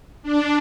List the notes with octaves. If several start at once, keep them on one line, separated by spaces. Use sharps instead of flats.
D4